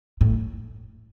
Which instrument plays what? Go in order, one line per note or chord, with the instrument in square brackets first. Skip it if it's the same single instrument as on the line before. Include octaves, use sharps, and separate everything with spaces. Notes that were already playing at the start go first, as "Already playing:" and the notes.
[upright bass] A2